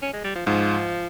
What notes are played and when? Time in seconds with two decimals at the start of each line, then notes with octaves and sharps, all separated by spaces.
0.02 C#4
0.13 G#3
0.24 G3
0.35 F3
0.46 G#2 F3